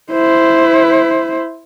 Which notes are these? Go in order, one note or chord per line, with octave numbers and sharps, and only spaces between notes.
E4 C5